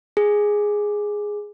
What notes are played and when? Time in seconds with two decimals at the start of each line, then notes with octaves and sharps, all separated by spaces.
0.17 G#4